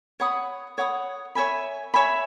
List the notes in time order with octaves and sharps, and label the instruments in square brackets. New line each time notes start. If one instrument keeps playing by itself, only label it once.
[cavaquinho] C#5 F#5 B5 D#6
C#5 F#5 B5 D#6
C#5 E5 G#5 B5
C#5 E5 G#5 B5